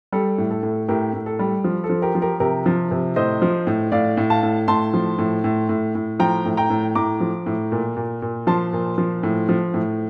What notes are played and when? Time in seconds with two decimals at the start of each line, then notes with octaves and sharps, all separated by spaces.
0.12 G3 A4
0.38 A2
0.51 A4
0.63 A2
0.89 A2 G4 A#4
1.13 A2
1.26 A4
1.39 G3
1.64 F3
1.84 A4
1.90 F3
2.02 G4 A#4
2.15 F3
2.21 G4 A#4
2.40 C3 G4 A#4
2.66 F3
2.91 C3
3.16 A2 C5 D#5
3.42 F3
3.67 A2
3.92 A2 D5 F5
4.17 A2
4.30 F5 A5
4.43 A2
4.68 A2 A5 C6
4.94 F3
5.18 A2
5.44 A2
5.69 A2
5.95 A2
6.19 F3 G5 A#5
6.45 A2
6.57 G5 A#5
6.70 A2
6.95 A2 A#5 D6
7.20 F3
7.46 A2
7.72 A#2
7.97 A#2
8.22 A#2
8.47 F3 A5 C6
8.73 A#2
8.98 F3
9.23 A2
9.49 F3
9.74 A2